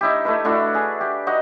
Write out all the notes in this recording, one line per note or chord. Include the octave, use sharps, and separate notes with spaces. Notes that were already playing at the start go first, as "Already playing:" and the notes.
D#4 E4 G4
A3 E4 B4
A3 D4 E4 F#4
G#4
G4
D#4 F#4 D#5 F#5